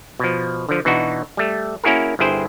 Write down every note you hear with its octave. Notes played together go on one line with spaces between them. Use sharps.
B2 F3
D3 F3
B2 E3 D4 D#4 F#4
G3 A3
A#3 C#4 E4 F#4 G#4 A#4
G1 G2 E4 G#4 C5 G5